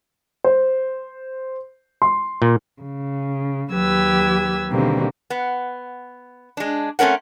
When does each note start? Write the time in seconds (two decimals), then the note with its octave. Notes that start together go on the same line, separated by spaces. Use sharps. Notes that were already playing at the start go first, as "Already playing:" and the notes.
0.44 C5
2.02 C6
2.42 A#2
2.82 C#3
3.72 D#2 F#3 G4 B4 E6 G#6
4.70 B2 D3 D#3 G3 A#3 C4
5.30 B3
6.57 G#3 D4
6.99 A3 C4 C#4 A#4 F#5